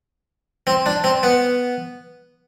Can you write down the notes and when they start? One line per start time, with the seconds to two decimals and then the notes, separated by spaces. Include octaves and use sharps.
0.67 C4
0.86 D4
1.04 C4
1.23 B3